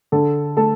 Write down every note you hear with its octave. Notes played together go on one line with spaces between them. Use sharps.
D3 A4
A3 A4